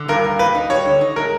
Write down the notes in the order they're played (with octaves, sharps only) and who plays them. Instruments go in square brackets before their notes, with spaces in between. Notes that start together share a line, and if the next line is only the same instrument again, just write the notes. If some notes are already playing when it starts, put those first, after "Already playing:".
Already playing: [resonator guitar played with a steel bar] D3
[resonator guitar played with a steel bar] G2 [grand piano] A#4
[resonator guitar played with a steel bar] A#3
[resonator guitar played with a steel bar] A#3 [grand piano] B4
[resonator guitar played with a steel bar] D#4
[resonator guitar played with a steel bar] G3 [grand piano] C#5
[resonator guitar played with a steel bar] D3
D#4
[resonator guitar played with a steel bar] G#3 [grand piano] A#4